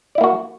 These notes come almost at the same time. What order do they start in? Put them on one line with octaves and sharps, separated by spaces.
D5 E4 A#3 F#4